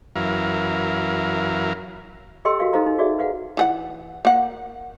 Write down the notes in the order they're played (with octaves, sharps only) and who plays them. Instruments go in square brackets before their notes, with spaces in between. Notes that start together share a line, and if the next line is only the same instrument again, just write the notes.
[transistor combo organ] F#2 E3 A#4 F5
[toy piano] G4 A4 D#5 G5 C6 E6
F#4 A#4 F5 G5
D#4 A4 C5 F5 A#5
D#4
F#4 G#4 D5 E5
B4 F5 F#5
[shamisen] E3 G#4 F#5
A#3 F#5